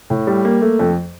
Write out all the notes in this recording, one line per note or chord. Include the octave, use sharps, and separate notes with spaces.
A2
G3
A#3
A3
F2